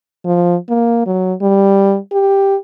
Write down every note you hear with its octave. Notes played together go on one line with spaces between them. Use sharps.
F3
A#3
F#3
G3
G4